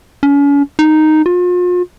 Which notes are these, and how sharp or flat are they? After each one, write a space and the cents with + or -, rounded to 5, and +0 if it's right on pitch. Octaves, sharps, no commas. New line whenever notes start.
C#4 +40
D#4 -5
F4 +40